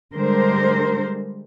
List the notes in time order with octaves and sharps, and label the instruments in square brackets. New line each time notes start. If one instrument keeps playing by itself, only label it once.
[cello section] D3 G3 G#3 A#4 C5